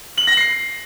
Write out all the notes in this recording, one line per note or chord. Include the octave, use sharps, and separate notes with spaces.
F#7
A#6
C7